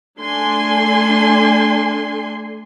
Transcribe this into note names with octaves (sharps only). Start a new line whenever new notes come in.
A3 D4 G#5 C6